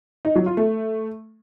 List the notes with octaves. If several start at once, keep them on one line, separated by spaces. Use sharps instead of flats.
D#4
F#3
F4
A3